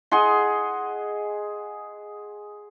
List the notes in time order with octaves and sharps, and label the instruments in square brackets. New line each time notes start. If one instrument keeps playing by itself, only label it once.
[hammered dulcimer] G#4 D#5 F#5 C6